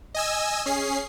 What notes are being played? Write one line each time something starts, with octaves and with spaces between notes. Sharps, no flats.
D#5 G#5 E6
C#4 G#4 C7